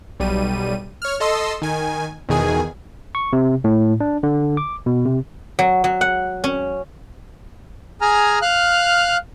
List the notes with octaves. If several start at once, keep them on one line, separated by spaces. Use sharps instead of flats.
B1 G3 D#7
C#5 F6
A4 D#5 C6 E6
D#3 G#5
E2 B2 D#3 G#4 G#5
C#6
C3
A2
D4
D3
D6
B2
C3
F#3
F#3
F#5
C#4
G#4 G#5 A#5 F6
F5 F6 F#6